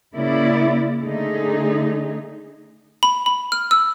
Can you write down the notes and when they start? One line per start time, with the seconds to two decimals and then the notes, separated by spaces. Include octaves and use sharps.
0.14 C#3 A#3 E4 D5
1.00 D3 A3 D#4 G#4
3.03 B5
3.26 B5
3.52 F6
3.71 E6